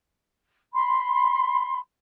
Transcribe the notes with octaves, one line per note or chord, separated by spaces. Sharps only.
B5 C6